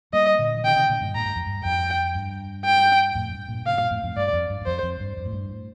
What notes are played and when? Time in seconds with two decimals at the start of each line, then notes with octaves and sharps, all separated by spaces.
0.13 G3 A#3 D#5
0.39 A#2 D3
0.57 F3
0.64 C3 D#3 G5
0.76 C3 D#3
0.89 A#2 D3
1.01 G2 A#2
1.15 A2 A#5
1.25 G2
1.36 F2
1.46 G2
1.64 F2 G5
2.15 G2
2.65 G5
3.15 F2 A2
3.32 G2
3.48 G2 A#2
3.66 A2 C3 F5
3.78 G2 A#2
3.91 F2 A2
4.03 F2 A2
4.17 G2 D5
4.33 F2
4.50 G2
4.61 G2
4.66 F2 C5
4.83 F2
5.00 G2
5.17 F2
5.25 A2
5.33 G2
5.49 A2